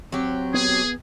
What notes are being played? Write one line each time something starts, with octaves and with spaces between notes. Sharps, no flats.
F#3 C4 G4
B3 G#4